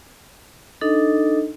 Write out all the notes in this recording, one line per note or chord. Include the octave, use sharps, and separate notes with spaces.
D4 D#4 A4 D#5